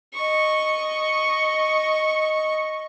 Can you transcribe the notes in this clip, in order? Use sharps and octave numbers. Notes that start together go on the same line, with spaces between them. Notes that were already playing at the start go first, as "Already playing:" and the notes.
D#5 C#6